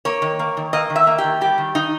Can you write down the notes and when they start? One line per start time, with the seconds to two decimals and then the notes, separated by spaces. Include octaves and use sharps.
0.05 A#3 C#5
0.22 D#3
0.39 A#3
0.57 D#3
0.73 A#3 D#5
0.90 D#3
0.96 E5
1.07 A#3
1.18 G4
1.24 D#3
1.41 G3 G4
1.58 D#3
1.75 D#3 D#4